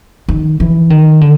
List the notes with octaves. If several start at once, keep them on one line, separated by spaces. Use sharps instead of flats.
D#3
E3
D#3
D3